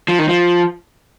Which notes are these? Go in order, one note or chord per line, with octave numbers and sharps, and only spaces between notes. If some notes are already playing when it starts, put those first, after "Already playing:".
F3
D#3
F3